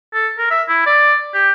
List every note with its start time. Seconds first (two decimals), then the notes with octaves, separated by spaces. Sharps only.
0.14 A4
0.38 A#4
0.50 E5
0.69 E4
0.87 D5
1.34 G4